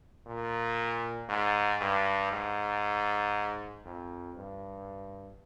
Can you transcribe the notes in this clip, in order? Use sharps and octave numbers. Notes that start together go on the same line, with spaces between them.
A#2
G#2
G2
G#2
F2
G2